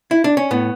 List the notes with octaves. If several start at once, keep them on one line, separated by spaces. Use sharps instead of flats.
E4
D4
C#4
A2 B3